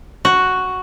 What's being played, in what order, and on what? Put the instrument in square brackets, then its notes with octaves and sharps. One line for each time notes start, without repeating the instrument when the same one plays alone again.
[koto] F#4